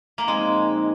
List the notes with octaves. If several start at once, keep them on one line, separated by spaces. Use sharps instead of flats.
A#3
A#2 F3 G#3 C4 D#4